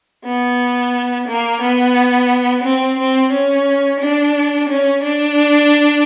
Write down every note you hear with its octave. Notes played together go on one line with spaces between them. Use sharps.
B3
A#3
B3
C4
C4
C#4
D4
C#4
D4